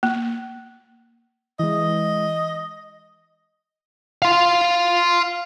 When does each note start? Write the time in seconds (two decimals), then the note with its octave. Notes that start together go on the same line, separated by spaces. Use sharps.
0.03 A#3
1.59 E3 G#3 D#5
4.22 F5 C6